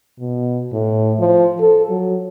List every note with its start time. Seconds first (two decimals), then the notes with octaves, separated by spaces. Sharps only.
0.20 B2
0.72 A2
1.19 F3
1.60 A4
1.90 F#3